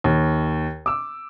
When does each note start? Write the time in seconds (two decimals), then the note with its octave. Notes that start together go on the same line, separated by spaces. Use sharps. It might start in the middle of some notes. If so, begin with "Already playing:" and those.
0.04 D#2
0.86 D6 E6